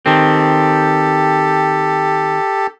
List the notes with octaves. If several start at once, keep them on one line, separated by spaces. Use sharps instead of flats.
D#3 C4 G4 A4